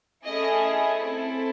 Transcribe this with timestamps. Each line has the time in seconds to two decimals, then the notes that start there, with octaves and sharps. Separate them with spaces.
0.25 A3 C#4 E4 G#4 D#5
0.97 C4 E4 A4